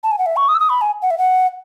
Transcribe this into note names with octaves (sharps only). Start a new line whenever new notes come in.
A5
G#5
F#5
E5
C#6
D#6
E6
D#6
B5
G#5
F#5
E5
F#5